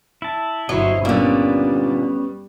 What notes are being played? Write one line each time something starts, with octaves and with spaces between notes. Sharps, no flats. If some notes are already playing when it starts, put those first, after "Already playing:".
E4 A5
G1 F#3 E4 C5 C#5 D#5
A#2 D3 G3 B3 C#4